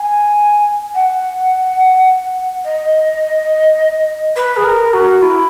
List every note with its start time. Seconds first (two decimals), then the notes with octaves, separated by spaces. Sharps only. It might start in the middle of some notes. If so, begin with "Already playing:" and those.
Already playing: G#5
0.95 F#5
2.65 D#5
4.36 B4
4.57 G#4
4.64 A#4
4.93 F#4
5.22 E4